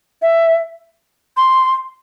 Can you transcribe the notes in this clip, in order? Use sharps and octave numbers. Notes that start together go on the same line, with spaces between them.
E5
C6